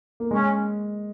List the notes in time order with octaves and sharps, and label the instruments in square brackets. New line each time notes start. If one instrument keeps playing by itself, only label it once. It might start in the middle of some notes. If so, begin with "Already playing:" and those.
[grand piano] A#3
[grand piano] G#3 [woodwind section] C#4